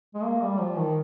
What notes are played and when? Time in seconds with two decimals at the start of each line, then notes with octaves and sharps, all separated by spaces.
0.14 G#3
0.23 A#3
0.42 G3
0.60 F3
0.78 D#3